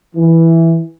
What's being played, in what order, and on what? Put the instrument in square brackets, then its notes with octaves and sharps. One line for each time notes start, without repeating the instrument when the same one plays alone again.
[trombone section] E3